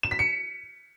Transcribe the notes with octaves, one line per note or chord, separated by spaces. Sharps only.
E7
B6
C#7